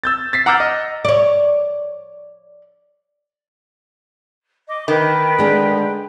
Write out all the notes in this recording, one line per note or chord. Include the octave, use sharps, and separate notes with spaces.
E6 G6 A6
A6 B6 C7
F#5 A#5 D6 E6 F6 G6
D#5
C#5 D5
D#5 D6
D#3 A#4 B4 G5
D3 G#3 D4